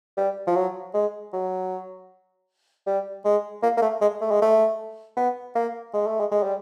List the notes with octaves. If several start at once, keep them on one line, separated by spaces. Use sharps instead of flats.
G3
F3
F#3
G#3
F#3
G3
G#3
A#3
A#3
A3
G#3
A3
G#3
A3
B3
A#3
G#3
A3
G#3
G#3
G3